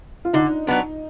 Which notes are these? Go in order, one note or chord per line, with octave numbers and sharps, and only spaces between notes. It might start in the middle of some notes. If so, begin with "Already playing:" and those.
F4
D3 D#4
F#3 B3 D4